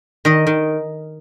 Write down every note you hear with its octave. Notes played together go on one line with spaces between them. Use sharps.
D#3 D#5
D#3